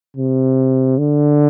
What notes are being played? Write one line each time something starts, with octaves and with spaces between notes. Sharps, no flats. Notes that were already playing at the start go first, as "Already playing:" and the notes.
C3
D3